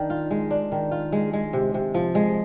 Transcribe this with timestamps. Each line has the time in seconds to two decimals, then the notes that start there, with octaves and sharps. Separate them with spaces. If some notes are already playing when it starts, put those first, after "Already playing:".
Already playing: D#3 D4
0.10 F4
0.31 G#3
0.51 D4
0.72 D#3
0.91 F4
1.12 G#3
1.33 G#3
1.53 C3
1.74 C3
1.94 F3
2.15 G#3